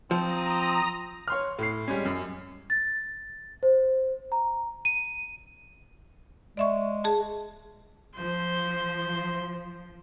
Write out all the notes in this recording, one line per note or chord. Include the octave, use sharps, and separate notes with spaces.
F3 C4 A#5 D#6
C#5 C6 F6
A2 C7
G3 G#3 C#4
F#2
A6
C5
A#5
D#7
G#3 D5 E5 C#6
G#4 A5
F3 C5